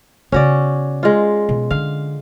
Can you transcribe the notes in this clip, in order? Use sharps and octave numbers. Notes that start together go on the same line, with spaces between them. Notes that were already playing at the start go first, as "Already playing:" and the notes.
C#3 B3 C#4 F#4 D5
G#3 F4
B2
D3 F5